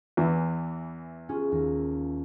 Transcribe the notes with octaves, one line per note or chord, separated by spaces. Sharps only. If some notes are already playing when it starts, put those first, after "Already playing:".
E2 E3
C#4 F4 G#4
D#2